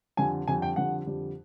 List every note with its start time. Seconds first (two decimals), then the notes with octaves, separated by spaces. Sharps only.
0.17 F2 D3 G3 G#5
0.47 F2 D3 G3 G#5
0.62 G5
0.76 F2 D3 G3 F#5
1.06 F2 D3 G3